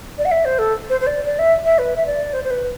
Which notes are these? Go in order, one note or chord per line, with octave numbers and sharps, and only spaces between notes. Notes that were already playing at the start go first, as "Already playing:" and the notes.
D5
F#5
E5
C5
A4
C5
C5
D5
D5
E5
E5
B4
E5
D5
C5
C5
B4